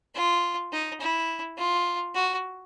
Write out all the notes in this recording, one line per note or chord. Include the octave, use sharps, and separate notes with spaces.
F4
D#4
E4
F4
F#4